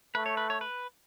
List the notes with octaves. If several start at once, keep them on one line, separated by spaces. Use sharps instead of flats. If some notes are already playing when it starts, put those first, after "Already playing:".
A3 B4
C#5
B4
C#5
B4